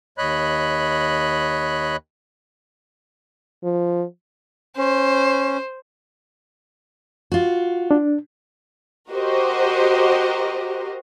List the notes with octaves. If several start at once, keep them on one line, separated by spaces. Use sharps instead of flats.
D#2 C#5 D#5 B5 F#6
F3
C#4 C5
F4 F#4
D4
F#4 G4 A#4 C5 D#5